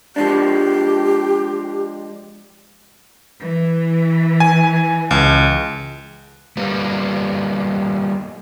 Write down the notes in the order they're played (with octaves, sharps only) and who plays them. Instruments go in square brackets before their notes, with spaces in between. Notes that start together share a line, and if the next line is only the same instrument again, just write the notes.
[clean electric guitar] F3 G#3 D4 [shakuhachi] G4
[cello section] E3
[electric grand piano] G#5
C#2
[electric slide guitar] G3 A#3 B3